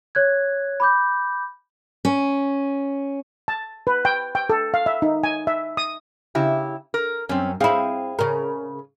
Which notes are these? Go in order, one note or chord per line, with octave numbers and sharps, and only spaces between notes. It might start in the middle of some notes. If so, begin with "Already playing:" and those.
C#5 F#6 G#6
B5 D6 G6
C#4
A5
B4
G5
G5
A4
F5
E5
D#4
G#5
E5
D#6
C#3 E4 G4
A#4
F#2 C4 C#4
C4 E4 G#4 F5
C#3 A#4